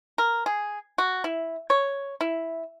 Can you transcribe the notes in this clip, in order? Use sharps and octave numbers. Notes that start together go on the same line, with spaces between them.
A#4
G#4
F#4
E4
C#5
E4